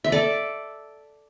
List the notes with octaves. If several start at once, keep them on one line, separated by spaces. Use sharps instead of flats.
E5
A4 D5